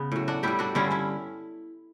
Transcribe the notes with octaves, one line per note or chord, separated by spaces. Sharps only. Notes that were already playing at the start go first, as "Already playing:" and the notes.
Already playing: C#3 B3
A2 F#3
D4 F#4
A2 G3 E4 G4
D4 F#4
G2 D3 G3 C#4 E4
C#4 E4